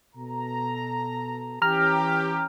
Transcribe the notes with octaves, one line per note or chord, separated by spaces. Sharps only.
B2 A4 A#5
E3 C#4 G4 A#5 F6